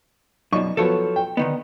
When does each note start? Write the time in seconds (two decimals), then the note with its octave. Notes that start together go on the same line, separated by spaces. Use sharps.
0.52 F#2 B2 D#4 D5 C#6
0.77 F3 F#3 B3 A4 C#5
1.16 G5
1.37 D3 D#3 B3 D#5